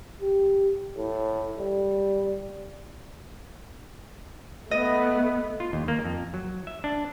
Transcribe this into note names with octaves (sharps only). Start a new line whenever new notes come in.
G4
A2
G3
A3 B3 D#5
F4
D#2
A#3
F2
F#3
E5
D4